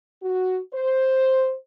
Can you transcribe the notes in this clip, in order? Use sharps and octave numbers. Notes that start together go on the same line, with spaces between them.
F#4
C5